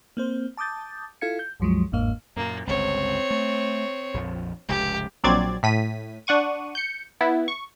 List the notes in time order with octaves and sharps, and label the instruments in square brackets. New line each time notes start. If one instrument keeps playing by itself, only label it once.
[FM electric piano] A#3 C4 C5
A5 D6 D#6 G6 A6
E4 F4 A4 F5 G#6 C#7
G6
C2 F#2 F3 F#3 G#3
G1 E2 G#2 A#3 F5
[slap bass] F#2 A#2 [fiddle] A#3
[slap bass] G1 C#2 [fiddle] C4 C#5
[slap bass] A3
A#1 F2 F3
[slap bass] F1 C#2 G#2 [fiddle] G4
[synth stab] A#1 F#3 C4 D5 G#6 A6
A2 B6 D#7
D4 F#5 C#6 D#7
G6 C#7
B3 E4
C#6